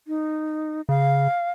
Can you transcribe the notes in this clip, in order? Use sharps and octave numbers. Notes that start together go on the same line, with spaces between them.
D#4
C#3 F5